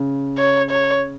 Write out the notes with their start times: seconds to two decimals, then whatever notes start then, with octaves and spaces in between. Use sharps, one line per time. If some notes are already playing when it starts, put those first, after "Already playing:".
Already playing: C#3
0.38 C#5
0.71 C#5